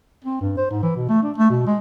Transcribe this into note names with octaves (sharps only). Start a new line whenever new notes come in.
C4
G2
C5
G#2
E3
B2
A3
D4
A3
B2
G#3